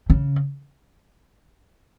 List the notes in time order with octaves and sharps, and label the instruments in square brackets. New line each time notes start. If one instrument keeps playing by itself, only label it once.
[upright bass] C#3